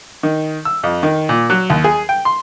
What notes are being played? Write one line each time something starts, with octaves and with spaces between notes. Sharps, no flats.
D#3
E6
F2
D#3
A#2
F#3
D#2
G#4
G5
C6